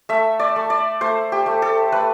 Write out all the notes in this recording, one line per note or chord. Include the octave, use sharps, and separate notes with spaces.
A3 E5
D5
A3
D5
A3 C5
G4
A3
A4
A3 B4